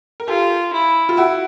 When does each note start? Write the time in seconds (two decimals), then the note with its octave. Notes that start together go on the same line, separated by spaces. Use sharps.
0.20 A#4
0.28 F4 G4 A4
0.73 E4
1.09 F4
1.17 E4 F#4